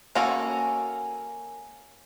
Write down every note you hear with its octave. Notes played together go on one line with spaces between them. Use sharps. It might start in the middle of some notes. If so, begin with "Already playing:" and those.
A#3 C#4 F#4 A4